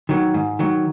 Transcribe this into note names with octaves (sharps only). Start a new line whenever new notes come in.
D#3 F#3
G#2
D#3 F#3